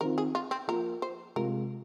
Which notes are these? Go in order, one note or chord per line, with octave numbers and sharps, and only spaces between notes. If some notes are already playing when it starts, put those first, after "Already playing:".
D#3 C4 F4 A#4
G#4
F4
C4
F3 A#3 F4 A#4
C5
C3 G#3 F4 A#4